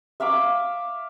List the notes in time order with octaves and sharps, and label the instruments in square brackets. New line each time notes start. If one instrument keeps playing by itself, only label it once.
[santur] E5 F5 B5 D6